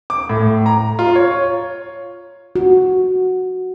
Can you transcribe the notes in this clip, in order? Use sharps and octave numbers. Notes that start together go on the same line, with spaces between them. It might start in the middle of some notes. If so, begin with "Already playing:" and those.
D6
A2
A#5
F4
C#5
F#4